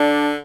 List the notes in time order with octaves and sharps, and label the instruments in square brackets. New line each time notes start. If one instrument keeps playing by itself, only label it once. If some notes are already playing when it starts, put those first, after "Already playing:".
Already playing: [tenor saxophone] D3 [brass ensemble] D4